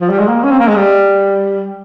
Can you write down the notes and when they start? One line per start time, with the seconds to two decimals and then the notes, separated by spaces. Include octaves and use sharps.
0.01 F3
0.10 G3
0.19 G#3
0.28 A#3
0.44 C#4
0.51 C4
0.59 A#3
0.68 G#3
0.76 G3